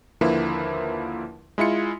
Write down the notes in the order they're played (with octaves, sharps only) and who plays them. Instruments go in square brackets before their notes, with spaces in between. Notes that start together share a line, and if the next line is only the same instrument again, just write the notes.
[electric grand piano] D#2 D3 F3 A#3 E4 B4
G#3 E4 F4 C#7